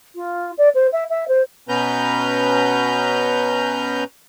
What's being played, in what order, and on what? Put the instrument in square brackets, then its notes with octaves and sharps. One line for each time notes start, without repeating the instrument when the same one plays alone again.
[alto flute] F4
D5
C5
E5
E5
C5
[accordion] B2 B3 C#4 B4 A#5 G6